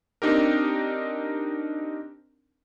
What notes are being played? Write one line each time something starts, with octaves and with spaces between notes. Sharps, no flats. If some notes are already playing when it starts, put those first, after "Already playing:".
C4 D4 D#4 G4 A#4